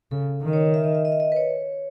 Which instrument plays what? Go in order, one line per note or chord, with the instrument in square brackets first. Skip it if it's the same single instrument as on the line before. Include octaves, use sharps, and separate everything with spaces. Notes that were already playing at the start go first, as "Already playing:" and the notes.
[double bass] C#3 [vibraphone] A4
[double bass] D#3
[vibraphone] D#5
C#5
E5
D#5
E5
D#5
E5
D#5
B4
C#5